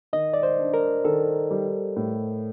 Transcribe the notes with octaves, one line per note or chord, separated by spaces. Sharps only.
D#3 D#5
D5
C5
D4
A#4
D#3 A4
G3
A2